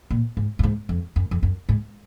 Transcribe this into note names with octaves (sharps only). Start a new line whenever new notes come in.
A#2
G#2
F#2
G#2
F2
F#2
F2
F#2
G#2